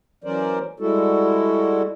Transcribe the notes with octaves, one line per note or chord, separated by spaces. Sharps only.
E3 F#3 C#4 A#4 C5 D5
G3 G#3 E4 F#4 A4